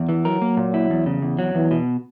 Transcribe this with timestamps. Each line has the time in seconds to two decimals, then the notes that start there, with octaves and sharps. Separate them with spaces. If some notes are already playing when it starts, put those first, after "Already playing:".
Already playing: E2
0.09 E3
0.25 F#3 A#4
0.42 A#3
0.57 A#2
0.74 E4
0.90 E2
1.06 C#3
1.22 E2
1.39 F#3
1.55 E2 E3
1.71 B2